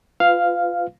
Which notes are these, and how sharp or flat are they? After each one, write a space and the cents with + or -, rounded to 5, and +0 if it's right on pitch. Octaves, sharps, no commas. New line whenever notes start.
F4 +0 B4 +30 F5 +0